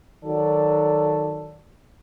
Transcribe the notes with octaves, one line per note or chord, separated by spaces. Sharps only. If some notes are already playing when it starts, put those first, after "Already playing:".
D#3 F#3 A4 D5